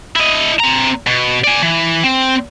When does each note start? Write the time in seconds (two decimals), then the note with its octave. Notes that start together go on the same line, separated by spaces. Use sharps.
0.16 E4 D#5
0.60 C4 A#5
1.07 B2
1.44 D5 G#5
1.63 E3
2.04 C4